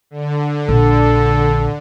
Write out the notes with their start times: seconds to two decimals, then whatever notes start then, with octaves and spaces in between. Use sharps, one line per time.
0.11 D3
0.69 A#1 A4